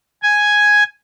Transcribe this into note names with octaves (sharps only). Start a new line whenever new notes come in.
G#5